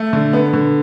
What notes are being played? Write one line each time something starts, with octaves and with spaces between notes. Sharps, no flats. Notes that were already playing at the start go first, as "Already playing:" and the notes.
Already playing: A3
D3
B3
D3